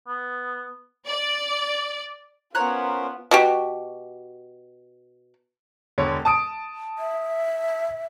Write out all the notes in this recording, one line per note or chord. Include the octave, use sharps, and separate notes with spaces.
B3
D5
B3 C#4 F4 A#4 C5 C#5 A#5 F#6
B2 F#4 G4
E1 D3 C#5
A5 D#6 D7
E5